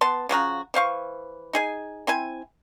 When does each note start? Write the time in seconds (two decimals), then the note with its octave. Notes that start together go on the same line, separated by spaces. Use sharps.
0.01 B3 A5 C6
0.29 C#3 F3 F#4 A#5
0.74 E3 C5 F5 C#6
1.53 D#4 G#4 G#5
2.07 C4 E4 G#5